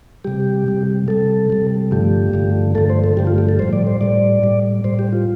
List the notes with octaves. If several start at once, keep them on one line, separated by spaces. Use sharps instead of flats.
C3 G3 G4
C3 G3
C3 G3 A4
C3 G3
G2 D3 F3 A3 G4
G2 D3 F3 A3
G2 D3 F3 A3 A4
C5
A4
G2 D3 F3 A3 G4
F4
G4
A4
A2 G3 C5
D5
C5
A2 G3 D5
A2 G3
A2 G3 C5
G4
F4